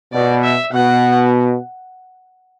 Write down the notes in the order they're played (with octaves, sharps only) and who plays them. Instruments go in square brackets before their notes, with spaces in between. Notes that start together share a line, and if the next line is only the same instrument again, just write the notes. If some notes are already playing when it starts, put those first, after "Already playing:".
[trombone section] B2 [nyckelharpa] D5
[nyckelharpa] E5
[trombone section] B2 [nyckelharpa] F#5